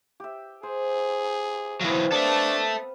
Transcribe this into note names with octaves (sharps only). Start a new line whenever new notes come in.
G4 E5
G#4 C5
E3 F#3 B3 C4 F5
D4 A4 E5 D#6